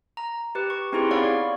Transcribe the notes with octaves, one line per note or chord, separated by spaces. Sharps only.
A#5
G4 B4
C#6
C4 D#4 E4 G4 G#4 C6
B3 C#5 D5 F5 B5 C#6